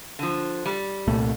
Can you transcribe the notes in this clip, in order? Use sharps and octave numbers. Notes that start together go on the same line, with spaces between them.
D3 F3
G3
C2 A#2 A3